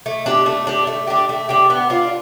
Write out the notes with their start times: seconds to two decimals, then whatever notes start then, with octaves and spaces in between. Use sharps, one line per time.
0.06 A3
0.26 D4 G4
0.46 A3
0.67 D4 G4
0.87 A3
1.07 D4 G4
1.29 A3
1.49 D4 G4
1.70 B3
1.90 D4 F4